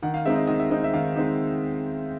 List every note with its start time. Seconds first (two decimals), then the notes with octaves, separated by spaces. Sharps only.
0.02 D#3 F#5
0.14 F5
0.25 G#3 C4 D#4 E5
0.36 D#5
0.47 D#3 D#5
0.59 E5
0.70 G#3 C4 D#4 D#5
0.84 E5
0.93 D#3 F5
1.16 G#3 C4 D#4